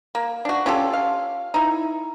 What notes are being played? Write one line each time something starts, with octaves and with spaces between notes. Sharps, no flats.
A#3
D4 F#4
C#4 F4 G4 A4
F5
D#4 E4